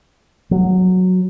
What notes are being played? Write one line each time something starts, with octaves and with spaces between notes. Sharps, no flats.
F#3